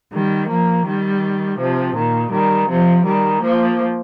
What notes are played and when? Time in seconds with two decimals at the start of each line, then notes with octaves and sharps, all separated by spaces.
0.13 D#3 G3
0.49 F3 A#3
0.86 D#3 G3
1.59 C3 F3
1.96 A#2 D#3
2.33 D#3 G3
2.69 C3 F3
3.05 D#3 G3
3.42 F3 A#3